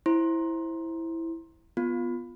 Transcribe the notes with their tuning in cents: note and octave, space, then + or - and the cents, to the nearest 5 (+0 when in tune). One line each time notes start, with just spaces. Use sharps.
E4 +0 C5 +10 C6 +20
B3 +0 F4 +0